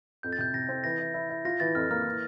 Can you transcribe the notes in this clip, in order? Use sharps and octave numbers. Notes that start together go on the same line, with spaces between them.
F2 G6
A6
C3 G6
C3 A#6
C4
E3 A#6
E4
E4
E4
F4 A#6
E3 A6
F2 F6
A#3 F6
E3